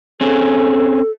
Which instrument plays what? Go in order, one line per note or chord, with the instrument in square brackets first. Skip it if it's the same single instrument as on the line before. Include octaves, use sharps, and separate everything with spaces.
[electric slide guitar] C4 C#4 G#4 [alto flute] A4